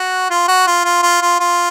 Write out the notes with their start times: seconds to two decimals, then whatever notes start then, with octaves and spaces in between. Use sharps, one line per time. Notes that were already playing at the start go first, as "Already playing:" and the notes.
Already playing: F#4
0.30 F4
0.48 F#4
0.67 F4
0.85 F4
1.03 F4
1.22 F4
1.40 F4